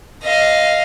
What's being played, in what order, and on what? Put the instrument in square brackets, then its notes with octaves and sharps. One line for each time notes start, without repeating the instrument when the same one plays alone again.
[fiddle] D#5 F5